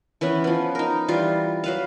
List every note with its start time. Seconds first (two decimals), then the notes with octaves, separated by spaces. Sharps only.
0.21 E3 B3 C#4 B4
0.44 F3 B3
0.75 D#4 A#4
1.08 E3 G3 F4
1.64 F#3 B4 F5